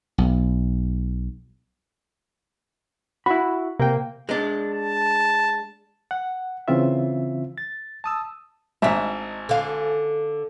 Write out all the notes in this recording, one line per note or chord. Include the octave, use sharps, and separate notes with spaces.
B1
E4 F#4 B5
C3 A#3 G5
G#3 D4
A5
F#5
C#3 E3 C4 F4 E5
A6
A5 D#6 E6
G#1 D4 D#4 E5
D3 F5